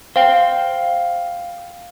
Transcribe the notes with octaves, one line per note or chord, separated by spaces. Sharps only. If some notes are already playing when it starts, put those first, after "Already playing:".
C5 F5 G5